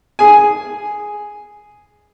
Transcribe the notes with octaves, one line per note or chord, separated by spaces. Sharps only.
G#4 G#5